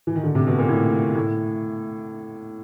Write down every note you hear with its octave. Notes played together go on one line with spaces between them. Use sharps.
E3
D#3
D3
C3
B2
A#2
A2
A2